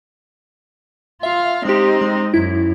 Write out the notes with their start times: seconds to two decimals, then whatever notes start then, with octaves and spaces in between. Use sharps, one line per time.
1.23 F4 E5 F5
1.65 G#3 C4 D#4 G4
2.01 G#3
2.34 F#2 E4